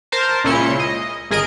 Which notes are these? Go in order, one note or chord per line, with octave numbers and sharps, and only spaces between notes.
A#4 C5 A5
C#2 A#2 C#4 E4 C6 C#7
D#5
G#1 G#4 A#4 D#5 D7